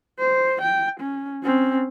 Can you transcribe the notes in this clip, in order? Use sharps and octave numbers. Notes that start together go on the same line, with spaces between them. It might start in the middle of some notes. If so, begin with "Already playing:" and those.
C5
G5
C#4
C4 C#4